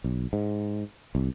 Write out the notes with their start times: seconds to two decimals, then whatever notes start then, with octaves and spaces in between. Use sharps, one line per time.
0.04 B1
0.33 G#2
1.15 C2